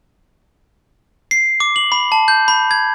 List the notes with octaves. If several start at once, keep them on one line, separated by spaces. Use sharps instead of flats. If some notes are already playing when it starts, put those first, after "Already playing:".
C7
D6
F#7
B5
A5
G6
B5
G#6